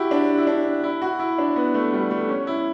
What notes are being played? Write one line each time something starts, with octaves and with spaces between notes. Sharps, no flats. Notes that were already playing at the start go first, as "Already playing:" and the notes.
Already playing: E4 F#4 G4
D4
E4
D4
E4
F#4
E4
D4
B3
A3
G3
A3
C#4
E4